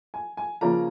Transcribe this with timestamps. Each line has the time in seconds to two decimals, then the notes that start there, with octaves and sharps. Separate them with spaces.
0.14 G#5
0.37 G#5
0.61 C#3 F3 A#3 C#4 A#5